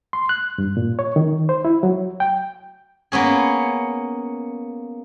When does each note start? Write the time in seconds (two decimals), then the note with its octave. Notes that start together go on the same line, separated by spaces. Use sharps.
0.13 C6
0.29 F#6
0.58 G2
0.77 A#2
0.99 C#5
1.16 D#3
1.49 C5
1.65 E4
1.83 F#3
2.20 G5
3.12 A#3 B3 C#4 G#4